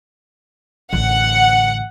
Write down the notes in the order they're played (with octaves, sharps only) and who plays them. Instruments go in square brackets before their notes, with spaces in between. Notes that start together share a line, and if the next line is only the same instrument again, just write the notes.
[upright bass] A1 D3 [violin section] F#5